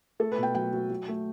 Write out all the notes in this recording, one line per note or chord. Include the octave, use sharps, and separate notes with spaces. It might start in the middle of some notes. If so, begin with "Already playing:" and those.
A3 A4
B4
B2 G5
F#3 G5
F#3
F#3
A3